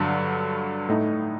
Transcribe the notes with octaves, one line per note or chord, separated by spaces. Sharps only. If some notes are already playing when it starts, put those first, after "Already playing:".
Already playing: G2 D3 F#3
A2 A3 D#4